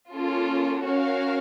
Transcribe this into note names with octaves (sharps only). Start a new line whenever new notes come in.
A#3 C#4 F4 A4
C#4 F#4 A#4 C#5 F5